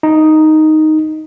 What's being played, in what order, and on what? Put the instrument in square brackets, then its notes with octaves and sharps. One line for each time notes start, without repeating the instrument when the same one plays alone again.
[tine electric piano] D#4